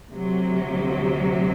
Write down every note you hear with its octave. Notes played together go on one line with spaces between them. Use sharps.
D2 C3 F#3